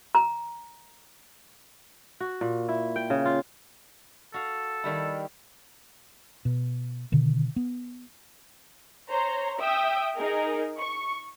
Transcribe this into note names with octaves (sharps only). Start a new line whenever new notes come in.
A#5
F#4
A#2
E4
G5
C#3
F4
F#4 A4 F5
D#3 G3 E4
B2
B2 D3 D#3
B3
C5 C#5 A#5
E5 G5 D#6 E6
D#4 G#4 A#4
C#6